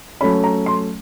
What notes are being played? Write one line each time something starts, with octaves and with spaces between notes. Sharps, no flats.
F#3 A3 C#4 B5
A#5
C6